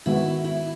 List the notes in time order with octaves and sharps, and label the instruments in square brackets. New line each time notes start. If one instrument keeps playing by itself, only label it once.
[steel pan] D#3 G#3 B3 F#4 [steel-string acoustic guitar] E4
[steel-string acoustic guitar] E4